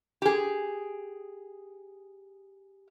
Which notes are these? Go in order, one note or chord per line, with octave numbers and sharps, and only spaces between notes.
G4 G#4